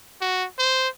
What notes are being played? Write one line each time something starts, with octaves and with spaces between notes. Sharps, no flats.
F#4
C5